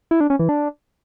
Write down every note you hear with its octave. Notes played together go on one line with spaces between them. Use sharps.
E4
D4
C#4
E3
D4